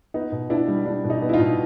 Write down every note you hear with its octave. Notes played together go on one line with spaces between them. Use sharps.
B3 D#4
B2
B3 D4 E4
G3
G3 D4
B2
D#4
B3
E4
D#4 F4
B2